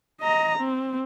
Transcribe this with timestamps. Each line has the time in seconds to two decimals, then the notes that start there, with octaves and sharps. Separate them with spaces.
0.21 D#5 A#5
0.58 C4